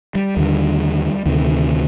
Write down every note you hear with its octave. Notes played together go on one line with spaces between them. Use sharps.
G3
D#2 D3
D2 C3 D#3